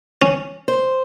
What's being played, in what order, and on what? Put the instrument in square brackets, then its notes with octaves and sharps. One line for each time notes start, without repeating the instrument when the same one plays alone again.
[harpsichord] C#4
[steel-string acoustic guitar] C5